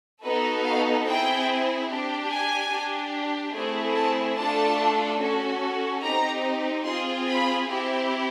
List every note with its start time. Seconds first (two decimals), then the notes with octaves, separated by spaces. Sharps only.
0.23 B3 D#4 F#4 A4 B4
0.65 F5
1.05 C4 E4 G#4 G5
1.88 D4 G4
2.30 G#5
2.71 D4 G4
3.54 A3 C4 E4 G#4
3.95 A5
4.36 A3 D4 F4 A4 A5
5.20 C#4 F#4 A4
6.02 C4 D#4 G4 A#5
6.85 C4 F4 G#4 C6
7.27 B5
7.68 C4 E4 G4